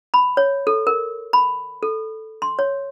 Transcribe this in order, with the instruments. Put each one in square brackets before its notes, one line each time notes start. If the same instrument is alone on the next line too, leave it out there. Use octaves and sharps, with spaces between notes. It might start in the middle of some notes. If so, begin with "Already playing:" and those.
[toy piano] B5
C#5
A4
A#4
B5
A4
C6
C#5